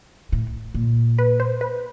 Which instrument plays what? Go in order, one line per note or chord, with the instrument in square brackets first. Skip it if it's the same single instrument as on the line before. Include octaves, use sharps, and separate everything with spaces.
[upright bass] A2
A#2
[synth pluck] B4
C5
B4